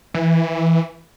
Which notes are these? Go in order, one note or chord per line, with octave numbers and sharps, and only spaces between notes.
E3